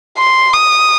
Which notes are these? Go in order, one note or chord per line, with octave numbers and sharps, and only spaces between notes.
C6
D#6